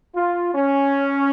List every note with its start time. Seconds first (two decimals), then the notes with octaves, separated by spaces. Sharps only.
0.16 F4
0.55 C#4